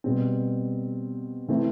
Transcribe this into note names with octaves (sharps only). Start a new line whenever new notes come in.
B2 G3 C4
C3 E3 A3 C4 E4